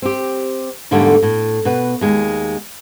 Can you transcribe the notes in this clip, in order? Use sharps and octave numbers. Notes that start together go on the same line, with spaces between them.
C4 G4
E2 G#2 D3 G3 A3 A#3
A2
B2 B4
D#2 G#3